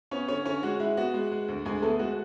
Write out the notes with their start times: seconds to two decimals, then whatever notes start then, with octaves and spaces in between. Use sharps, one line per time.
0.11 B3 C#4 C#5
0.28 D3 C#4 C#5
0.45 D3 C#4 C#5
0.63 G#3 F#4
0.79 G#3 E4
0.97 B3 F#4
1.14 G#3
1.32 G#3
1.48 D2
1.65 D2 G#3 G#4
1.82 A3 B3 A4
1.99 G#3 F#4